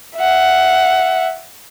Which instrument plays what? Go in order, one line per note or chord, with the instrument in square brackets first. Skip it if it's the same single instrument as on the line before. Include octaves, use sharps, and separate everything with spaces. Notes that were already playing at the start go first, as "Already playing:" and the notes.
[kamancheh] E5 F#5